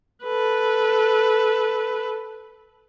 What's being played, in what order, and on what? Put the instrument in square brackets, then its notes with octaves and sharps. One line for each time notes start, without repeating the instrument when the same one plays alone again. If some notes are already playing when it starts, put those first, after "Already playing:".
[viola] A4 B4